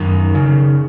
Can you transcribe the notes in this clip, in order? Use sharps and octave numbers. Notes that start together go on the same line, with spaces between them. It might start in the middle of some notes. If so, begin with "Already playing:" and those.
Already playing: F#2 D#3
C#3